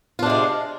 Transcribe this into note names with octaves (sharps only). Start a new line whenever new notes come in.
C3 G#3 D4 F4